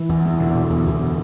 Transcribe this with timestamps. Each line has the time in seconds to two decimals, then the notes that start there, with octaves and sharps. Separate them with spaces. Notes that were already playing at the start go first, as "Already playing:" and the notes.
Already playing: E3
0.09 E2
0.25 E2
0.39 B2 D3
0.54 B2
0.70 E2
0.86 E2
1.01 B2